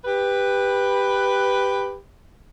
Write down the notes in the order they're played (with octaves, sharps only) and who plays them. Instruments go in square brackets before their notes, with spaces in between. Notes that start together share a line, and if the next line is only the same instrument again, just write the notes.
[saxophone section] G4 B4